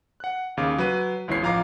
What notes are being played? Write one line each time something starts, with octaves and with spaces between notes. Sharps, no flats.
F#5 F#6
D#2 C#3 F5 D6
F#3 B4 D#7
G1 C#2 E3 E4 C#5 C7
A1 F3 F5 A#5 D6